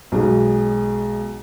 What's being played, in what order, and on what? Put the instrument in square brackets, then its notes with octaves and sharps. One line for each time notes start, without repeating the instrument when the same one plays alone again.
[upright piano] B1 B2 G#3